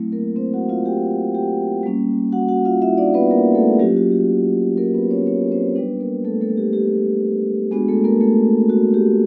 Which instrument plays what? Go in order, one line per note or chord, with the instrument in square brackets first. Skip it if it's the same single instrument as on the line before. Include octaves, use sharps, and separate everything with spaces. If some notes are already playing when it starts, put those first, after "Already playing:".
Already playing: [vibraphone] F#3 A3 C4 E4
A#3 A#4
C4 C5
F#4 F#5
F4 F5
G4 G5
G4 G5
G3 A#3 C#4
F#4 F#5
F#4 F#5
F4 F5
E4 E5
D4 D5
B3 B4
A#3 A#4
A3 A4
F#3 A#3 C#4 F4 G4
F#4
G4
A#3 A#4
B3 B4
C#4 C#5
C#4 C#5
C4 C5
G3 B3 D4 B4
A#3 A#4
A3 A4
A3 A4
G4
G4
G#3 B3 D4 F#4 G#4
A3 A4
A#3 A#4
A3 A4
F#4
G4